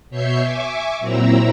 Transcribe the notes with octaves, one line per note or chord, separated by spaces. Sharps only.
B2 C#5 E5 G6 C7 C#7
E5 G#5 C#6 D6
A#2 F#3 C4 E4 A#5 E6